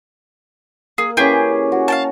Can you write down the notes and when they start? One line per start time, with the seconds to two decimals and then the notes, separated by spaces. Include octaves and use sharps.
0.98 A#3 G#4
1.17 E3 C#4 G4 G#4
1.72 F#4
1.88 F5 G5 A5